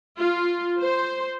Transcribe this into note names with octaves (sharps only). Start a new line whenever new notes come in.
F4
C5